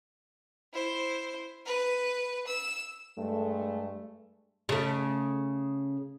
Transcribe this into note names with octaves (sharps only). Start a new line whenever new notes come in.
E4 C5
B4
E6
G2 G#3 A3
C#3 A3